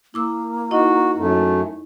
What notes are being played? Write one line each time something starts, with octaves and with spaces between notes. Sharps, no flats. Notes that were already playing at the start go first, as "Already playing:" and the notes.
A#3 E4 D6 E6
D#4 E4 F#4 D#5
F#2 A3